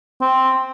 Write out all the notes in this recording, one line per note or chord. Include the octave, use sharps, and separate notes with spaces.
C4